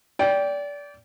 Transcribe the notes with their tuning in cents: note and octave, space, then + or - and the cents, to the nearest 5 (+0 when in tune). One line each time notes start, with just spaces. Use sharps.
D5 -25 G5 +0